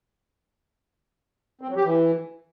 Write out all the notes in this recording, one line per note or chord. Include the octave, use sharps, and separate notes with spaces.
C4
F#3
G4
E3